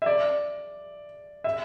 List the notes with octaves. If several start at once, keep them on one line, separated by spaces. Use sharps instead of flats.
E5
D5
E5